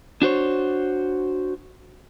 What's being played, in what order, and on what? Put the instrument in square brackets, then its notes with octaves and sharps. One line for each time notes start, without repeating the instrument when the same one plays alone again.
[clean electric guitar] D4 F#4 C5 C#5